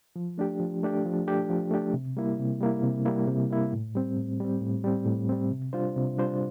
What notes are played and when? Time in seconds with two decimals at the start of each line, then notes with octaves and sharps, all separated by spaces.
0.16 F3
0.38 A3 D4 G4
0.60 F3
0.83 A3 D4 G4
1.05 F3
1.27 A3 D4 G4
1.50 F3
1.71 A3 D4 G4
1.94 C3
2.17 G3 A#3 E4
2.39 C3
2.61 G3 A#3 E4
2.83 C3
3.05 G3 A#3 E4
3.27 C3
3.50 G3 A#3 E4
3.73 A2
3.96 G3 C4
4.17 A2
4.40 G3 C4
4.61 A2
4.84 G3 C4
5.06 A2
5.29 G3 C4
5.51 C3
5.73 G3 D4 F4 C5
5.96 C3
6.18 G3 D4 F4 C5